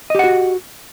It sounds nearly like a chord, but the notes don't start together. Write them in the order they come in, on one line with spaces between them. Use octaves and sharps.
D#5 G4 F#5 F#4